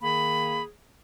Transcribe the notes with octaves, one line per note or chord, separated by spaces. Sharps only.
D#3 A#3 G#4 B5